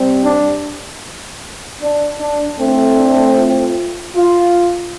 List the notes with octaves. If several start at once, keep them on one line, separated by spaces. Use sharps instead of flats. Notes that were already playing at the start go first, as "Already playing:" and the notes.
Already playing: C3 G3 C4
D4
D4
D4
A2 A3 C4
D4
F4
F4